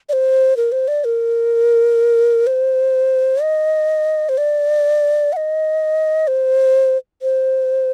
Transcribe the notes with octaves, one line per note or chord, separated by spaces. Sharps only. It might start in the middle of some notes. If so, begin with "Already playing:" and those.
D5
C5
A#4
C5
D5
A#4
C5
D#5
C5
D5
F#5
D#5
C5
C5